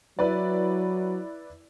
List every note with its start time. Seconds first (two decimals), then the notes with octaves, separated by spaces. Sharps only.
0.19 F#3 E4 B4 D5